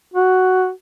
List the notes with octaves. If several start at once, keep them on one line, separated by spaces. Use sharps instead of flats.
F#4